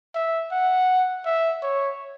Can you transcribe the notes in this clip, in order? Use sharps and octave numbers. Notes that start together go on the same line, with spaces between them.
E5
F#5
E5
C#5